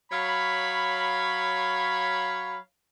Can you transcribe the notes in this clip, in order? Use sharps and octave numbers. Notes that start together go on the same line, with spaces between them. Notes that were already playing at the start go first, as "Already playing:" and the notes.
F#3 C#5 F5 B5